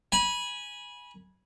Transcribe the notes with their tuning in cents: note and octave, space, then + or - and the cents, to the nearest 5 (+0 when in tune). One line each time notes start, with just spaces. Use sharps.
G#5 +0 B5 -25